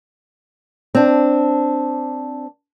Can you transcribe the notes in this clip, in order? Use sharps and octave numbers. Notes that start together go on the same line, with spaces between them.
C4 D4